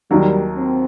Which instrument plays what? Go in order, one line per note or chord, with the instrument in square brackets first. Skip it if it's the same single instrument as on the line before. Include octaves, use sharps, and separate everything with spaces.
[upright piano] D#2 D#3 F#3 [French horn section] G3
[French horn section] C4